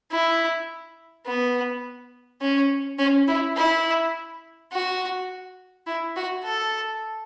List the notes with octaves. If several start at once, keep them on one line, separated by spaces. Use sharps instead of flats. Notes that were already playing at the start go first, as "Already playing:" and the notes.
E4
B3
C#4
C#4
E4
E4
F#4
E4
F#4
A4